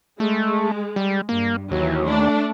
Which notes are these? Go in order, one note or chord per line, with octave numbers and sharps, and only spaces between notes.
G#3 A3
G3
G2 A#3
D#2 E3 F#3
A3 D4